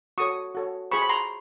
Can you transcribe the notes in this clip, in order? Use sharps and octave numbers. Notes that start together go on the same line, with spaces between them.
F#4 A4 C#5 C#6 D#6
F#4 A4 C#5
F4 G#4 C5 B5 C#6
B5
A#5 C6